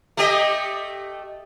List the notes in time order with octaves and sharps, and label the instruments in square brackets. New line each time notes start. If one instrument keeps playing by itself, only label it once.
[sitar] A3 G4 D#5